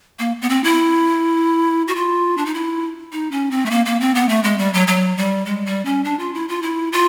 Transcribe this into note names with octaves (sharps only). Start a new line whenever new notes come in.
A#3
B3
C4
E4
F#4
F4
D4
D#4
E4
D#4
C#4
C4
A3
A#3
A#3
C4
B3
A3
G#3
G3
F#3
F#3
G3
G#3
G3
C#4
D4
F4
E4
F4
E4
F4